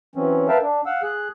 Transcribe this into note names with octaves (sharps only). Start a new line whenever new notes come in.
E3 F#3 C4 C#4
A#4 B4 E5 F5 G5 A5
D4
F5 F#5 E6
G#4 F#6